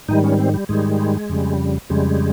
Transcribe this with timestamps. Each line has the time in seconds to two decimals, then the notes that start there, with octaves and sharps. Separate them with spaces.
0.08 G#2 D#3 G3 D#4
0.24 C#4
0.39 C4
0.54 G3
0.69 G#2 D#3 G3 G#3
1.30 F2 C#3 G3
1.90 F2 C#3 G3 G#3